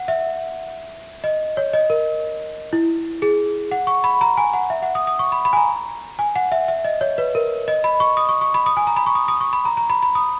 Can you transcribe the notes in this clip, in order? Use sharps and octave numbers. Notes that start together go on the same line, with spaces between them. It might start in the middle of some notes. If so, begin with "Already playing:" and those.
Already playing: F#5
E5
D#5
C#5
D#5
A#4
E4
G#4
F#5
C#6
B5
A#5
G#5
F#5
E5
F#5
D#6
D#6
C#6
B5
B5
G#5
A#5
G#5
F#5
E5
E5
D#5
C#5
B4
A#4
D#5
B5
C#6
D#6
C#6
C#6
B5
D#6
G#5
A#5
B5
C#6
D#6
D#6
C#6
B5
A#5
A#5
B5
B5
D#6